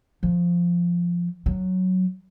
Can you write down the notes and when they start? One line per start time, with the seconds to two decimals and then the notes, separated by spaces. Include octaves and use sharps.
0.23 F3
1.46 F#3